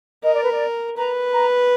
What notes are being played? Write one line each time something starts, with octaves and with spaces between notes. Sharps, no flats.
A#4 D#5
D5
B4
D5
B4 A#5
A#5